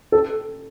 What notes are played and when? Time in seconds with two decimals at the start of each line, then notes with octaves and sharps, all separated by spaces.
0.12 A4